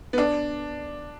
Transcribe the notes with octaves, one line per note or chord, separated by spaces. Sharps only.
B3
D4